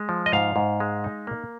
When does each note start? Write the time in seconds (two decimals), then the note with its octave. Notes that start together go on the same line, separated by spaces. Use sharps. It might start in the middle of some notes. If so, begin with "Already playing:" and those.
Already playing: G#3
0.09 F3
0.26 D#5
0.33 G#2 F5
0.56 G#2
0.80 G#3
1.04 D#4
1.27 A#3